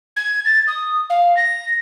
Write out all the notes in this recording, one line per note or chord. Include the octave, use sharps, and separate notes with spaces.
G#6
A6
D#6
F5
A#6